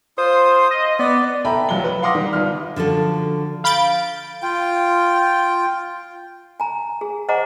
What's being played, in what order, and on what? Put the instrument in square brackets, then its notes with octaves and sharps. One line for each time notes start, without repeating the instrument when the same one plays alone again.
[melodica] F4 D#6 [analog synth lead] C5
[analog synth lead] D#5
[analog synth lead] B3 [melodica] D5
[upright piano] A4 E5 G5 A#5 B5
F1 F#3 F4 G7
B4
F5 F#5 C6 D6 D#6 A#6
D#3 G3
G1 F4 F6
[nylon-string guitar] D3 F3 F#4 A4
[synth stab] F5 B5 G6 A6 D7
[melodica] F4 G5
[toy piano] G#5 A#5
G#4
C5 D#5 F#5 G#5 A#5 D6